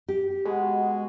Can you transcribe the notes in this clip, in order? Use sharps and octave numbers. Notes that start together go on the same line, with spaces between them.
G4
B2 G#3